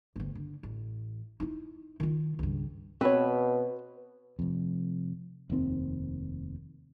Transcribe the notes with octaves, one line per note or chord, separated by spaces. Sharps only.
G1 D2
D3
A1
D#4 E4
D#3 F4
C#2 G2
B2 C4 B4 C#5
F1 F2
F1 D#2 D#3 C4